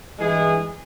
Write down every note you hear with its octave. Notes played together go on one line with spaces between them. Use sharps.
G2 E3 G#3 G#4